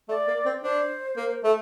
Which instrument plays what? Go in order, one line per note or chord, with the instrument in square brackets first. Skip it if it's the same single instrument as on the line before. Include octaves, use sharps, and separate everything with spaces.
[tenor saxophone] A3 [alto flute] D5
[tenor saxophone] A#3
C4
[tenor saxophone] D4 [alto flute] C5
[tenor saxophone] A#3
A3